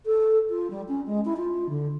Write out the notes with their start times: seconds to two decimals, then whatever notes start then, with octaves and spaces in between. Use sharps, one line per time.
0.06 A4
0.49 F4
0.70 G3
0.88 C#4
1.06 G#3
1.25 E4
1.37 F4
1.69 D3